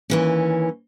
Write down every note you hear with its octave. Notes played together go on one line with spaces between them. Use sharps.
D#2 E3 C#4